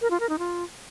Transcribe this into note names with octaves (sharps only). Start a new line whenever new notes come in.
A#4
F4
A#4
D#4
F4